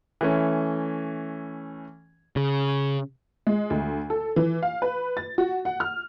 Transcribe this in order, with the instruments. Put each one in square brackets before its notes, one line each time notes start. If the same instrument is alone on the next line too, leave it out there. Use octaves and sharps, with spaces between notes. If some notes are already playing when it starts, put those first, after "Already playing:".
[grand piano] E3 A3 C#4
[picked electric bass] C#3
[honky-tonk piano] G#3
D2
A4
E3
F5
B4
A6
F#4
F#5
F6